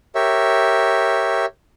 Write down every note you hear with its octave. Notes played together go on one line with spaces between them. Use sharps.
G4 A#4 C#5 E5